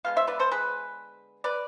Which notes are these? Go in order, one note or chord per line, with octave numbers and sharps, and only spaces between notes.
D3 G#3 B3 F5
C5 E5
B4 D5
A4 C5
G#4 B4
B4 D5